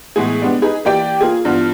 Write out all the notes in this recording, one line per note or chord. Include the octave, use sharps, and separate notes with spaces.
A2 E3 G#3 B3 G#4
G3 G#3 B3 D4
D#4 G#4 B4
E3 A#3 G4 D5 G5
A#3 F4 G#4
G2 E3 B3 F4